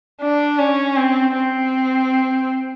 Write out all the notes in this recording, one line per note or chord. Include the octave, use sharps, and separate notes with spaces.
D4
C#4
C4
C4